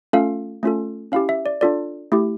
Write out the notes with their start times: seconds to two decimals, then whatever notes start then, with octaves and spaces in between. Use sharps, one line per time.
0.13 A3 C#4 F4 A4 F5
0.63 A3 C#4 F4 A4
1.12 C#4 E4 G4 F5
1.29 E5
1.46 D5
1.61 D4 F4 A4 D5
2.12 A3 E4 G4